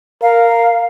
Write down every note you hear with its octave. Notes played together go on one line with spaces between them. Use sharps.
A#4 F5